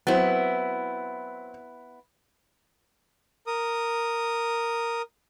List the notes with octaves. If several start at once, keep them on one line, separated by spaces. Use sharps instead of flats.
F#3 B3 C4 E4
A#4 D#6